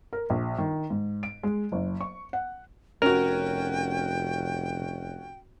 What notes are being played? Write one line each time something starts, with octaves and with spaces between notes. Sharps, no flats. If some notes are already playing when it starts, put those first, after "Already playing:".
A#4
A#1
D#3
G#2
D7
G#3
F#1
C#6
F#5
F1 C#4 F#4 A#4 G5